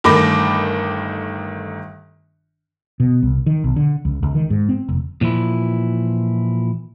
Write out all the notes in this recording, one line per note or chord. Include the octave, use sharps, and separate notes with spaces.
G1 D#3 A3 B5 D6 A#6
B2
C2
D#3
B1
D3
C#2
C#2
D#3
G#2
C4
F1
A#2 E3 F3 E4